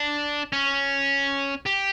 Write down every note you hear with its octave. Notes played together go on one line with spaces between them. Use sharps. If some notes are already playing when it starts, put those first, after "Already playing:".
Already playing: D4
C#4
G4